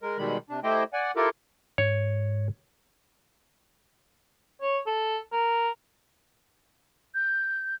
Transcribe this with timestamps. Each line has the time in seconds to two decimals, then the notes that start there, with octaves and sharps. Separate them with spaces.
0.03 G#3 A#4
0.18 B2 D#3 G3 G#3 B5
0.50 C3 D4
0.64 A3 E4 G4 C5 D#5 G5
0.93 D5 F#5 G#5
1.16 E4 F4 G4 A4 A#4
1.78 G#2 C#5
4.62 C#5
4.86 A4
5.32 A#4
7.15 G6